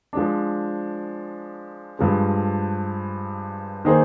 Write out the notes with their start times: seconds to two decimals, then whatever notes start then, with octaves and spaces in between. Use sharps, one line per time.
0.13 F3 G#3 D4
1.99 G2 F3 G#3
3.85 D#3 A#3 D#4 G#4 C5